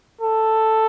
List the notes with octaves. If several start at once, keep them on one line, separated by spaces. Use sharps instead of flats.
A4